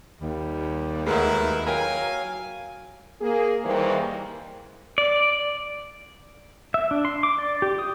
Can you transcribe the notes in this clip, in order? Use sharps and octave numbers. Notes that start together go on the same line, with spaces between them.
D#2 G3
D2 G#3 D#4 E4 A#4 B4
F#3 A#4 F5 G5 G#5 A#5
A#3 G#4
D#2 D#3 E3 G3 A#3 C5
D5
E5
D4
C6
D6
D5
G4
D#6